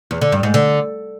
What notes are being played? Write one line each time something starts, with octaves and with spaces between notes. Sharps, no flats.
E2
D3
G2
G#2
D3